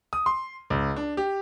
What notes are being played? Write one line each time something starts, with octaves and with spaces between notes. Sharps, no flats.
D#6
C6
C#2
D4
G4